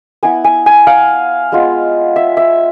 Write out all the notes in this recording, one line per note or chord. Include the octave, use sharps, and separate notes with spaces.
B3 E4 G#5
G#5
G#5
F5
G#3 B3 F4
E5
E5